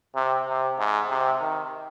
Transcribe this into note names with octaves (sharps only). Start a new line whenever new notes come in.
C3
C3
G#2
C3
D#3